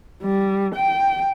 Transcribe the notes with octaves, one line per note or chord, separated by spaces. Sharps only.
G3
G5